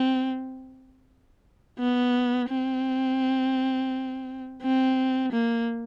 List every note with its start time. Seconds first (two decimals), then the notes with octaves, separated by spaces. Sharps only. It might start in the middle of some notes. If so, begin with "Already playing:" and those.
Already playing: C4
1.78 B3
2.49 C4
4.62 C4
5.32 A#3